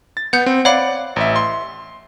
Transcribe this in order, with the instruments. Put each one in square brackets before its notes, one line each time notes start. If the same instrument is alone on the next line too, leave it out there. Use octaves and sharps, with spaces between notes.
[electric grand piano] A6
[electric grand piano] B3 [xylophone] F#5 G6
[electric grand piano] C4
[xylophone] C#5 F5 B5 [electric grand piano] D5 F#5
[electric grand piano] A1 E5
C6